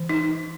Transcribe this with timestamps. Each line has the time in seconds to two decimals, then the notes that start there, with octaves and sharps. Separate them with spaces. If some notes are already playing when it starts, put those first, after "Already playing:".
Already playing: E3
0.09 D#4